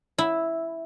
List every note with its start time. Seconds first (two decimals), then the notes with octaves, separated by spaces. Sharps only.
0.18 E4